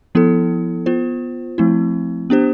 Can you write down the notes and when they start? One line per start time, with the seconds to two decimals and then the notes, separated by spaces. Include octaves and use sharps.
0.15 F3 B3 E4 A4
0.86 B3 F4 C5
1.58 F3 A3 C4 E4
2.30 B3 D4 G4 C5